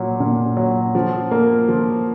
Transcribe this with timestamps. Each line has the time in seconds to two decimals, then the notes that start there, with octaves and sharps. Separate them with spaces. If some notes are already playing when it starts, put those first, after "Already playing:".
Already playing: A#2 F#3
0.20 A#2
0.57 F#3
0.95 F3
1.31 A#3
1.69 F3